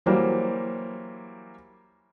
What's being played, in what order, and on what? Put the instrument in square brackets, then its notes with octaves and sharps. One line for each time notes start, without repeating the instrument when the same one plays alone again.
[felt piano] E3 F#3 G3 A#3 C5